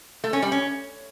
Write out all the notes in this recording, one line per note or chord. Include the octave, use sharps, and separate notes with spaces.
A3
C#4
G3
C#4